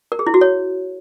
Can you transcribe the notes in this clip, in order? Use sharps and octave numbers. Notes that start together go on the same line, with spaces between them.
A#4
G#4
E4
F#4
C#5